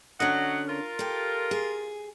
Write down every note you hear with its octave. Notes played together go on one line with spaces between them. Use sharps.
D3 F#3 C#4 D#5 F#5
F4 A#4
G4 A4
G#4